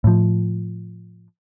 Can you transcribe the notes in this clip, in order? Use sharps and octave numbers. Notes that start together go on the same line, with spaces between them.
A2 F3